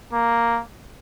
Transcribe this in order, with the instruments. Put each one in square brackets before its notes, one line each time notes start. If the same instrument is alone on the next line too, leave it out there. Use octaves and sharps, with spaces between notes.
[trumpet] A#3